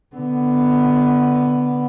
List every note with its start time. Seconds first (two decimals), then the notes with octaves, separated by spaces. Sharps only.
0.16 D3 B3